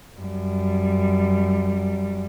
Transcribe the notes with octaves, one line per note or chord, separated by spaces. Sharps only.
F#2 G3